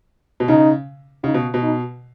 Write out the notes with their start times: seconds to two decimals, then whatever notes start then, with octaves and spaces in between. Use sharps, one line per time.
0.40 B2
0.48 C#3 D#4
1.24 C#3 D#4
1.34 B2
1.54 B2
1.62 D#4